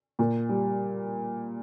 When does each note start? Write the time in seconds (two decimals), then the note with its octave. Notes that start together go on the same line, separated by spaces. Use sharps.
0.19 A#2
0.49 G3